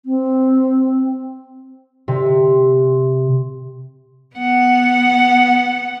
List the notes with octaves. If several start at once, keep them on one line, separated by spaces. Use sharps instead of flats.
C4
C3
B3 F#5